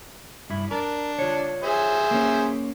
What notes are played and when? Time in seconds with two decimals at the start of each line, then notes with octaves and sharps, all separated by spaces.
0.50 G2 E4
0.71 D4 A#4
1.19 F4 C#5
1.63 G#4 C5 E5
2.11 A#3 C#4